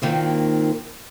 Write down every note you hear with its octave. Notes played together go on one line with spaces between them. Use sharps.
A#2 D#3 A#3 C4